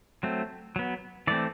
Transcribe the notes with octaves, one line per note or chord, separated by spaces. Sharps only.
F#3 A3 C4
F#3 B3
E3 A3 C4 D5